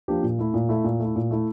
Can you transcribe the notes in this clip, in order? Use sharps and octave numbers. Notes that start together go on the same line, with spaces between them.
F3 A#3 D4 G4
A#2
A3 E4
A#2
A3 E4
A#2
A3 E4
A#2
A3 E4